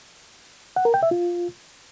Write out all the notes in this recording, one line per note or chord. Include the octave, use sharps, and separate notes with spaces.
F#5
A#4
G5
E5
F4